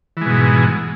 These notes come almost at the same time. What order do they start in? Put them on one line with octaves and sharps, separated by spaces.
E3 G#3 B2 G#2